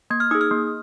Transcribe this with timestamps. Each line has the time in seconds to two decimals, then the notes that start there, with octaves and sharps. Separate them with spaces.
0.10 A#3 G#6
0.20 F6
0.31 D#4 G#4 D#6
0.41 F6
0.51 A#3